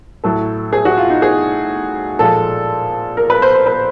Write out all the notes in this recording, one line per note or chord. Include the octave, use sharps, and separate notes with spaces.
A2 F#3 A4
G#4
F#4
F4
D#4
G#4
A#2 F3 G#3 A4
A#4
B4
C5
C5
B4